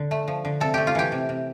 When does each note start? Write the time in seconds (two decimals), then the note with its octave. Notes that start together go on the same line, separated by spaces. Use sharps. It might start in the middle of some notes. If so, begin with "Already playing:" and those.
Already playing: D3
0.11 A3
0.28 F3
0.45 D3
0.60 C3 A4
0.74 A3 G4
0.87 F4
0.95 E3 G4
1.12 C3
1.29 C3